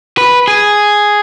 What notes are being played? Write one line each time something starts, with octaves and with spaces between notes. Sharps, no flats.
B4
G#4